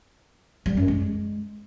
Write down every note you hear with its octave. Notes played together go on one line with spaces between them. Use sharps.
G3
F#2
G#3